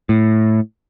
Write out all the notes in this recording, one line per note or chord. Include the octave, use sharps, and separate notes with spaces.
A2